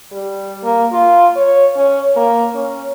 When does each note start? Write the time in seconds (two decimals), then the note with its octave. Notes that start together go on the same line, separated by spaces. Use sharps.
0.12 G3
0.63 A#3
0.93 F4
1.36 C#5
1.76 C#4
2.16 A#3
2.54 C#4